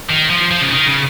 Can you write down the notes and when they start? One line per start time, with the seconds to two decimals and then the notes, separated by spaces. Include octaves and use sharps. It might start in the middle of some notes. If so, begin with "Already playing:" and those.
0.10 D#3
0.30 F3
0.51 F3
0.61 C#3
0.72 D#3
0.87 C#3